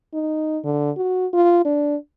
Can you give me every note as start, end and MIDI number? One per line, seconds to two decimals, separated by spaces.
0.14 0.58 63
0.64 0.91 50
0.97 1.27 66
1.34 1.62 65
1.65 1.96 62